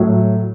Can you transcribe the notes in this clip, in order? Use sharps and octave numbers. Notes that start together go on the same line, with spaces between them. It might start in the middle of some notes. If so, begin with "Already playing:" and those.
Already playing: A2 F#3